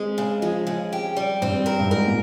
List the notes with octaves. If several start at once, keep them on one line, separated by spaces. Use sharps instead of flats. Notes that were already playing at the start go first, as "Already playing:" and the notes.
Already playing: G#3 C4
C#3
F3 G#3
C#3
G4
G3
G2 C4
A#4
G2
G#2 A#4
A#2